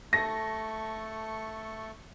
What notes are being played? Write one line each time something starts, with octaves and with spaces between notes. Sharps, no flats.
A3 A4 C#6 A#6